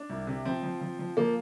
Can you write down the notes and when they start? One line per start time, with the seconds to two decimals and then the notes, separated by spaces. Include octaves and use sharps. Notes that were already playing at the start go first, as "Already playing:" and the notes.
Already playing: D4
0.09 C2
0.27 C3
0.45 F3 C4
0.63 F3
0.81 F3
0.99 F3
1.17 F3 A#3